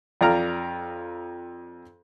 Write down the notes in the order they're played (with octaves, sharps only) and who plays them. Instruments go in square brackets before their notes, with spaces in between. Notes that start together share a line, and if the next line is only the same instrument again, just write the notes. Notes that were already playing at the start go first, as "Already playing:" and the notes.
[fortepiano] F2 D5 F5 A#5 F6